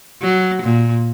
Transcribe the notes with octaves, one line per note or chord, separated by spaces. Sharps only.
F#3
A#2